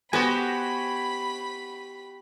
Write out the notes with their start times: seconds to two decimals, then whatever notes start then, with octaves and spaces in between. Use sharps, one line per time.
0.13 B3 F#4 G4 C5 G#5 B5